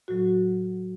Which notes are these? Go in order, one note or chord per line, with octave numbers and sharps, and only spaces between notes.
A2 F#3 F#4